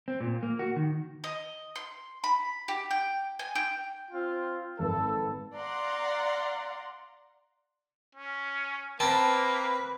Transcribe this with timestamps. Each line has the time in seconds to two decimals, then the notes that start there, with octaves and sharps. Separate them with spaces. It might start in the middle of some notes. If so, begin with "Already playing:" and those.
0.08 C4
0.21 A#2
0.43 A#3
0.59 F#4
0.76 D#3
1.24 D#5
1.76 C6
2.24 B5
2.68 G4
2.91 G5
3.39 G#5
3.55 G5
4.11 C4 F4
4.79 G#1 G#2 A4 B4
5.56 D5 F5 F#5 A#5 C6
8.15 C#4
9.00 A#3 C4 B4 A5